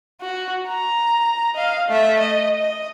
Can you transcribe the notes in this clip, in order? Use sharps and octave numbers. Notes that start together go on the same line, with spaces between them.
F#4
A#5
D#5 F5
A3 E5
D#5
D#5